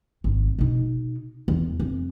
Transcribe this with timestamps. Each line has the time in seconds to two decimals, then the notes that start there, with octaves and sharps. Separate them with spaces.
0.24 G#1
0.59 B2 D#4
1.48 E2
1.80 F2